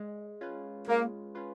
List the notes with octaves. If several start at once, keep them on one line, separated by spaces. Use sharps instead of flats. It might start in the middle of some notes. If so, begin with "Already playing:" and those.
Already playing: G#3
C#4 F4 B4
G#3 A#3
C#4 F4 B4